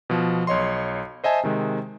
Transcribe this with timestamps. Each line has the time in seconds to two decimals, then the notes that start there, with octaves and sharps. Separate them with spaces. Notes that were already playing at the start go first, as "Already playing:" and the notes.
0.10 B2 F3
0.47 B1 C#5 D#5 C6
1.24 C5 D#5 E5 G#5 A5
1.43 C3 D#3 G#3